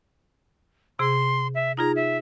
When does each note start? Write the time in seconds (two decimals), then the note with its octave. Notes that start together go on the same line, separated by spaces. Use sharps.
0.99 C3 G#4 C6
1.55 E5
1.77 D#4 F4 G#4 A#5
1.96 E5